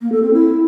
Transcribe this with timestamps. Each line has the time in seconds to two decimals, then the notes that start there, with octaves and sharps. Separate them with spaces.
0.02 A#3
0.12 A4
0.23 C4
0.33 E4